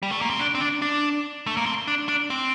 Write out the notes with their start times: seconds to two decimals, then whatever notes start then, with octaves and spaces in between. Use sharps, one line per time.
0.03 G3
0.11 A3
0.21 A#3
0.30 C4
0.39 D4
0.55 C4
0.61 D4
0.82 D4
1.47 A3
1.57 A#3
1.66 C4
1.87 D4
2.09 D4
2.30 C4